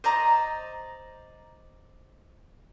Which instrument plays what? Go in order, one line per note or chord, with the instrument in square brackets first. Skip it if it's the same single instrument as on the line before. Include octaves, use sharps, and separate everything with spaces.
[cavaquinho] C5 D5 D#5 A#5